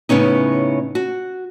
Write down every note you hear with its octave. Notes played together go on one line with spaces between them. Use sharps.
A2 C#3 B3 C#4 D#4
F#4